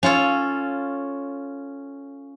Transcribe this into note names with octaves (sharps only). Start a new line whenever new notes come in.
C#4 F4 A4 C#5